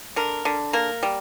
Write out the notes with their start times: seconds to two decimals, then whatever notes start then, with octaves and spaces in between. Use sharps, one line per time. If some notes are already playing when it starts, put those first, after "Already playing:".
0.16 D3 A#4
0.45 D3
0.73 A#3 A#4
1.03 G3